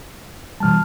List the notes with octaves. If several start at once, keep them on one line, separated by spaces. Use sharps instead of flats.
B2 E3 G3 A5 F6